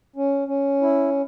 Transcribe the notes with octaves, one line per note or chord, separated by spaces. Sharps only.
C#4
C#4
E4